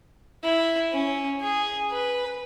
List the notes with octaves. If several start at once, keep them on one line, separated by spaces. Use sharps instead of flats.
E4
C#4
G#4
B4